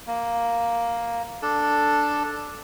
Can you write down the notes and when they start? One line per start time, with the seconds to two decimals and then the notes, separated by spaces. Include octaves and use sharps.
0.07 A#3
1.42 D4 A4